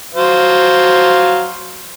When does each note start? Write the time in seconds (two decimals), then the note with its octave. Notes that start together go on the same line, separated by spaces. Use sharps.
0.15 F#3 C5 F5